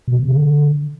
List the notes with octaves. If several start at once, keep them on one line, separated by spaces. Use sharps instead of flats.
B2
C3
D3